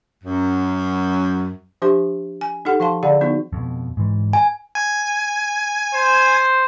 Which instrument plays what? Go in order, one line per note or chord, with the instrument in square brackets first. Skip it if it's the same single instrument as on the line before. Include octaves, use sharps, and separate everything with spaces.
[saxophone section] F#2
[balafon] F3 D4 G4 C5 E5 C6
G#5
D#4 G4 A4 F#5
F3 F5 A5 C6
D3 G#4 D5 F5 F#5 B5
F3 B3 D#4 E4 F#4
[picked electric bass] F2 B2
G#2 E3
[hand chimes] G#5
[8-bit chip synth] G#5
[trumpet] C5